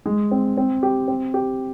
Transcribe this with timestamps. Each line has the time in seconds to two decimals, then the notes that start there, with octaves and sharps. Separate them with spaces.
0.06 G#3
0.31 C4
0.57 C4
0.83 G4
1.08 C4
1.34 G4